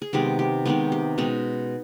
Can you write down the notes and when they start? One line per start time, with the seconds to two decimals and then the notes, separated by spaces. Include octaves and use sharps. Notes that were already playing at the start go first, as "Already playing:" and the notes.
0.02 G#4
0.13 C3 D#3 G#3 B3 G4
0.39 G4
0.65 C3 D#3 G#3 B3 G4
0.92 G4
1.18 B2 G#3 C#4 D#4